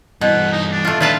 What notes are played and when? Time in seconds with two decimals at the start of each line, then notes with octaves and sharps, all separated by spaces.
0.21 G2 B2 E3 F#5
0.52 D#4
0.72 D4
0.85 A3 F4
1.00 A#2 D#3 D4 F4 B4 A5